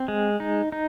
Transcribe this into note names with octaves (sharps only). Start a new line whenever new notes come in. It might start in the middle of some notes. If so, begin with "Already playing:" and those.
Already playing: C4
G#3
D#4
D#4